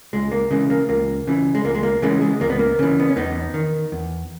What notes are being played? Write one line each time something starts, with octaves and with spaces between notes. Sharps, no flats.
C#2 G#3
A#3
C#3 E3 G#3
A#3
C#2 A#3
C#3 E3
G#3
C#2 A#3
G#3
A#3
C#3 E3 G#3
G#3
C#2 A#3
B3
A#3
C#3 E3
B3
C#4
E2 B3 D#4
D#3
E2